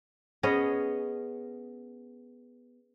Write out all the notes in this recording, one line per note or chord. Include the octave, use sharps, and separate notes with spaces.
B3 C#4 G#4 D#5